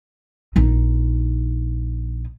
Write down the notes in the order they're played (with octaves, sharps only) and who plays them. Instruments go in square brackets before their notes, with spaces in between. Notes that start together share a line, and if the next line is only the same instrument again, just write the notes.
[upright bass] A#1 D#4